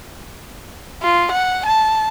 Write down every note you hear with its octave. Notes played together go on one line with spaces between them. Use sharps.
F4
F#5
A5